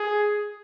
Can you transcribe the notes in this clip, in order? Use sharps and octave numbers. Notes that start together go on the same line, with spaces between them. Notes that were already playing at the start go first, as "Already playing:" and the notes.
Already playing: G#4